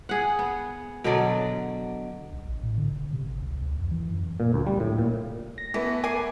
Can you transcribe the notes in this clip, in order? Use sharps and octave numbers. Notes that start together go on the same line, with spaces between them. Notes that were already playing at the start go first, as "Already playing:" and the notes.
G#4 F#5
B3
B2 D3 F#3 D5
C2
A1
A2
D3
D#1
C3
G#1
C#2
D2
F2
E3
F#2
A#2
D2
G3
A2
A#2
A#6
E3 A3 B3
A#4 G#5 D6 C7